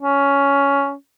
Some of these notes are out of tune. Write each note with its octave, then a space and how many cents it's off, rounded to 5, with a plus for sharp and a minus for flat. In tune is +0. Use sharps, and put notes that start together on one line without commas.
C#4 +10